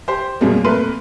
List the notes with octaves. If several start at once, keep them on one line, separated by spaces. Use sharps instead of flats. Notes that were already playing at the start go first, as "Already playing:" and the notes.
G4 C5
F#2 B2 G3 G#3 A#3
F2 A#2 A3 A#4 B4 C6